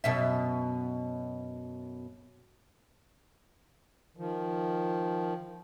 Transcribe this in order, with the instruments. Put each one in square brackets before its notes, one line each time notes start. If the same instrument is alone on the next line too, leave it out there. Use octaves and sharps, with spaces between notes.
[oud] F#2 B2 E5
[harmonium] D#3 F3